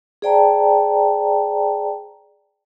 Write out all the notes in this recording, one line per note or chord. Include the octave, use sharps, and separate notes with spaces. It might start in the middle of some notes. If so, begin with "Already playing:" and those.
G#4 C5 D5 G5 A5 A#5